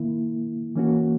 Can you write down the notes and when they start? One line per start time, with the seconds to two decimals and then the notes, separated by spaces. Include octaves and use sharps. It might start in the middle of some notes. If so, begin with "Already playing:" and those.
Already playing: D#3 A#3 E4
0.76 E3 A#3 C#4 F#4